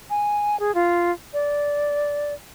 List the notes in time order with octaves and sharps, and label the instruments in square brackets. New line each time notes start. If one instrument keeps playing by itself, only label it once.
[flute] G#5
G#4
F4
D5